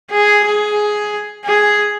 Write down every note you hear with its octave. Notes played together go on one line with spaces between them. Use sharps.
G#4
G#4
G#4